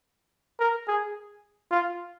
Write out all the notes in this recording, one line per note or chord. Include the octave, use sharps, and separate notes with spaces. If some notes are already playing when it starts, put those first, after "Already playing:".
A#4
G#4
F4